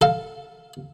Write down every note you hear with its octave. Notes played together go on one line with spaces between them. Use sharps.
A4 F5